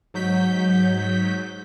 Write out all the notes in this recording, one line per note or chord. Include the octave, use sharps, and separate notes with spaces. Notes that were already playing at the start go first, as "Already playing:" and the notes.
G#2 F#3 G6 B6